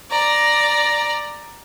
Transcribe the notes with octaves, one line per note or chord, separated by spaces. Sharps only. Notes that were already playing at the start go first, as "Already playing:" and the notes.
D5 A#5